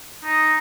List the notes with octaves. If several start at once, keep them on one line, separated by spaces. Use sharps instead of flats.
D#4